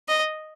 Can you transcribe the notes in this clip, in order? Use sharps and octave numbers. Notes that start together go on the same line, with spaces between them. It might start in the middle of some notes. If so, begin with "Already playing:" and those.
D#5